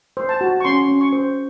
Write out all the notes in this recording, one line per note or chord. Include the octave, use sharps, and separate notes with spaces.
C5
A5
F#4
C#6
C#4 C6
C#4
C#6
C5